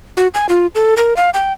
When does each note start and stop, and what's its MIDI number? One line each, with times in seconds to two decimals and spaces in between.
0.17 0.28 66
0.34 0.47 80
0.49 0.67 65
0.75 0.94 69
0.97 1.16 70
1.16 1.30 77
1.34 1.53 79